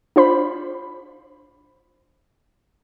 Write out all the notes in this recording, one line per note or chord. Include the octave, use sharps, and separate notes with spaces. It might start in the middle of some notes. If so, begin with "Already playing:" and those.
D4 F4 C5 B5